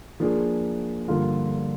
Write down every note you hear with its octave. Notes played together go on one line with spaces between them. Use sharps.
F3 A#3 D4 G#4
G2 D3 F3 A#3 F4